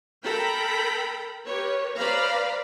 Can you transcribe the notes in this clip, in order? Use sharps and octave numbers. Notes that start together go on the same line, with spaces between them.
A4 A#4 G5 A#5 B5
G4 A#4 B4 C#5
B4 C5 D5 F5 A#5 B5